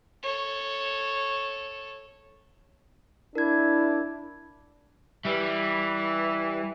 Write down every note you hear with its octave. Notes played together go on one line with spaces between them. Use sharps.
A4 C#5
D4 E4 A#4 G#6
E3 G3